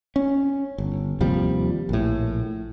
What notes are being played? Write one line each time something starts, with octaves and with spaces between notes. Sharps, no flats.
C#4
G1
D#2 C3 F3 G3
A#1 A2